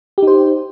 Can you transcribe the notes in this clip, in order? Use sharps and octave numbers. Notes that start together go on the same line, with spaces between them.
D#4 G4 C5